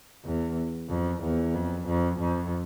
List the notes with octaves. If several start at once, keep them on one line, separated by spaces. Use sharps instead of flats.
E2
F2
E2
F2
F2
F2